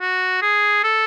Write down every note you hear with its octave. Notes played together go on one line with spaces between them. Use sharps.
F#4
G#4
A4